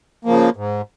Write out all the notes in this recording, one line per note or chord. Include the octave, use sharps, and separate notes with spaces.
C#3 F3 A#3
G#2